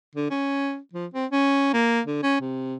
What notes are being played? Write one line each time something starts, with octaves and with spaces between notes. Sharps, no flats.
D3
C#4
F3
C4
C#4
A#3
D3
C#4
C3